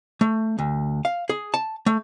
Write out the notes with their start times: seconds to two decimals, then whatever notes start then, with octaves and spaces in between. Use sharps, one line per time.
0.21 A3
0.59 D2
1.05 F5
1.30 G#4
1.54 A5
1.86 A3